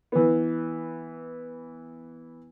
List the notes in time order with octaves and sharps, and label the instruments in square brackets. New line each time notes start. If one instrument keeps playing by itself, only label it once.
[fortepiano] E3 B3